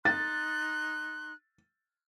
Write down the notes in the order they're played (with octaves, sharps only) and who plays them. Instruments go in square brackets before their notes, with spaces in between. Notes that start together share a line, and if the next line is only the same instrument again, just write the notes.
[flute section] D#4 C6 F#6 [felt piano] A6